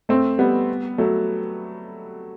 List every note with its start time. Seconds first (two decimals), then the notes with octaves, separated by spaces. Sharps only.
0.09 A3 C4
0.38 G3 B3
0.98 F#3 A3